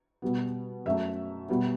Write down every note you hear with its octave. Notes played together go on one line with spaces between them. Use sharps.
B2 G3 B3
F#2 F#3 A3 E5
B2 G3 B3